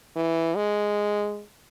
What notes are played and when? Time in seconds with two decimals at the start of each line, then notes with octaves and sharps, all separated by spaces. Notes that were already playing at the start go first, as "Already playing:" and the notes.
0.16 E3
0.56 G#3